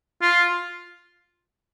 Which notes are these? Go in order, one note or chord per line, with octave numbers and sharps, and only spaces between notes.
F4